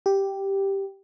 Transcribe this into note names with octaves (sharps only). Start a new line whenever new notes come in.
G4